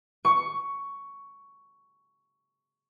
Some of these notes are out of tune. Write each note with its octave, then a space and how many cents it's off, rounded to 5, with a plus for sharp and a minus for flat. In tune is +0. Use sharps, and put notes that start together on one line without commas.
C#6 +10